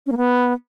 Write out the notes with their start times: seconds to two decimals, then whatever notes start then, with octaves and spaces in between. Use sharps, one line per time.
0.06 C#4
0.12 A#3
0.17 B3